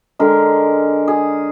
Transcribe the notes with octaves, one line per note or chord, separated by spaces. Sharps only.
D3 G#3 A#4
G#4